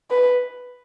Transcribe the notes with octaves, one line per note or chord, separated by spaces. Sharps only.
B4